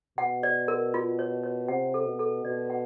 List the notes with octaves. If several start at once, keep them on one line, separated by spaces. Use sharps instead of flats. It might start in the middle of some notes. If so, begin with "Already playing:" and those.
B2 F#5
D5
A#4
F4
C#5
C#5
C3 F#5
A4
B2
A4
B2 D5
F#5